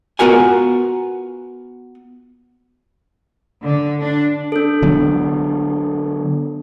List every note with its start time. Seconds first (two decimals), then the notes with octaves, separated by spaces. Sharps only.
0.19 B3 F4 F#4 A#4 F#5 G#5
3.62 D3
4.00 D4
4.52 D4 A4
4.82 D3 F#3 B3